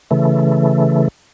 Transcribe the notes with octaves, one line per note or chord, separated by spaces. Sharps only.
C#3 E3 A3